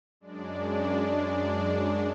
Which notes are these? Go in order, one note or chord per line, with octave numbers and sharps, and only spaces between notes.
F#2 G#3 D4 D5